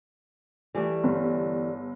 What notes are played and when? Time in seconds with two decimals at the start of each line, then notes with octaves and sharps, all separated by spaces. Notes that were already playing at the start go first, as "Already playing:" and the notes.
0.75 E3 G3 A3
1.04 G1